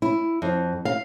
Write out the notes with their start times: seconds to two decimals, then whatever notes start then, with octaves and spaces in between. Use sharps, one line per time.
0.02 E4
0.42 F2
0.85 F5